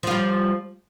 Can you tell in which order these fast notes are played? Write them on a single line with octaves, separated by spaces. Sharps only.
F3 F4 G3